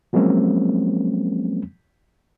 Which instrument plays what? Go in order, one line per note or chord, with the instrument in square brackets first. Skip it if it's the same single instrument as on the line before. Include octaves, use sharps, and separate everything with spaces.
[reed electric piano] F3 F#3 G#3 A#3 C4 C#4